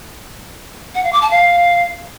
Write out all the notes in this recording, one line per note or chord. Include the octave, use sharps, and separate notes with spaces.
F#5
F5
D6
A5
F5